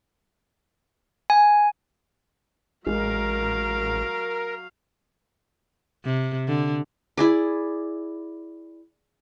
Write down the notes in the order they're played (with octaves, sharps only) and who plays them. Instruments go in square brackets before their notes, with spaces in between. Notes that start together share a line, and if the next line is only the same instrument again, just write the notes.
[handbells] G#5
[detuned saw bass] A1 [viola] F#3 F5 [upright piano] G#3 [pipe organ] A#4
[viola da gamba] C3
D3
[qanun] E4 G#4 D5